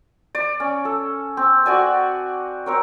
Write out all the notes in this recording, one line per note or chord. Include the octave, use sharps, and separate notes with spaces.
D5
C#4
A4
C4
F#4 D5 G#5
C4 A#4 C#5